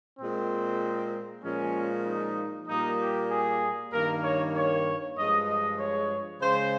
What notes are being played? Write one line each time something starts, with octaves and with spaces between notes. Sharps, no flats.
A#2 G#3 C4
A#2 F3 G#3 C#4
D#4
A#2 G3 A#3 D#4
G4
G#4
G2 D#3 A#3 A#4
C#5
C#5
G2 F3 G#3 D#5
D#5
C#5
C#3 G#3 C5